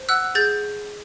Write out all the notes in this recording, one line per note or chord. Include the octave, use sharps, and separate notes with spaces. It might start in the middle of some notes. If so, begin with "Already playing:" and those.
Already playing: C5
F#5 E6 F#6
G#4 G6 A6